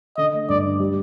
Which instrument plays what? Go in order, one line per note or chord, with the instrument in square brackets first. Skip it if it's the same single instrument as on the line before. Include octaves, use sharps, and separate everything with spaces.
[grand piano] D3 [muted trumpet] D#5
[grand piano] A3
[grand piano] G2 [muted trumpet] D5
[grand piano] D3
G3